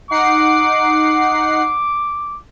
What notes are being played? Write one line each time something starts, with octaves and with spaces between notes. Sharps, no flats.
D#4 F#5 D6 C7